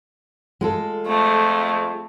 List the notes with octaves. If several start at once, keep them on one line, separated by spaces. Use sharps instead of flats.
G#3 F4 A4
F2 A3